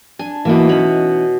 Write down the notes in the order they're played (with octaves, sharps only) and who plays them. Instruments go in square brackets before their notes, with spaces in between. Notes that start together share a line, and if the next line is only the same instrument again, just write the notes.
[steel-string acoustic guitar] D4 [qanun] G#5
[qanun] B2 E5 [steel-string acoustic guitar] E3 A#3 E4
[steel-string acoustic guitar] C#4 D#4 [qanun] C#5 B5